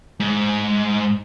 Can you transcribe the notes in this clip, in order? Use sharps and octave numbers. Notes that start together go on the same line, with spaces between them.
G#2